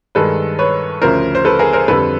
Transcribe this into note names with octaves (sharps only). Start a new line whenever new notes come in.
G2 D#3 G#3 A4 B4
B4 C#5
D2 C#3 F3 A#4 C5
C5
A4 B4
G#4 A#4
A#4 C5
F2 D3 G3 A4 B4